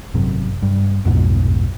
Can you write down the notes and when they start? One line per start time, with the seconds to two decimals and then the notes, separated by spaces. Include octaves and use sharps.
0.14 G#1 F#2 C3
0.62 G2
1.05 B1 F2 G#2 B2